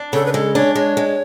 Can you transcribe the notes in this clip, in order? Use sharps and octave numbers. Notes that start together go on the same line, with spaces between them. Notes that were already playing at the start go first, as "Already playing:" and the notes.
Already playing: D4
C#3 A4
B4
G#3 A4
D4 C#5
G#3 C#5
G#3